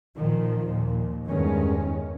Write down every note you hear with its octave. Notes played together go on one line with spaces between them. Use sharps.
A#2 D#3 F3
D#2 A#2
E2 G2 D#3 G#3 C#4